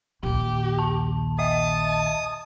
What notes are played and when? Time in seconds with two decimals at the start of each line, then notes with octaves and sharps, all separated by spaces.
0.23 A#1 D#2 G4
0.79 A5
1.39 D#5 E5 A5 D#6